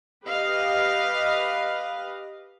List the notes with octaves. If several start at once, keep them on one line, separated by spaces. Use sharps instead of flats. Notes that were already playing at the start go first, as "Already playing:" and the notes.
G4 B4 D#5 F5